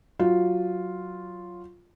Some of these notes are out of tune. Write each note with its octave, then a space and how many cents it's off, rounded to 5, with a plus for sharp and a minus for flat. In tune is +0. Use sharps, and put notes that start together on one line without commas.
F#3 +0 F4 +0